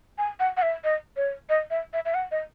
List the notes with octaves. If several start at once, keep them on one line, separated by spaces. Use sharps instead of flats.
G#5
F#5
F#5
E5
D#5
C#5
D#5
E5
E5
E5
F#5
D#5